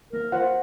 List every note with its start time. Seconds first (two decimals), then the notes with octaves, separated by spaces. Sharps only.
0.13 A#3 A#4
0.32 F4 C5 F#5